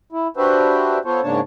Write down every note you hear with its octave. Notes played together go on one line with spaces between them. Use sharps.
E4
D4 F#4 G4 B4 C5 E5
B3 F4 A4 C5 C#5
G#2 C#3 A#3 D4 C#5 A5